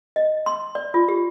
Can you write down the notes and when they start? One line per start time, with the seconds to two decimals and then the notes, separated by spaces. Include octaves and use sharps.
0.16 D#5
0.46 C6
0.75 D5
0.94 F4
1.08 G4